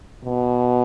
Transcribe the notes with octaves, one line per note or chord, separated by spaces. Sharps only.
B2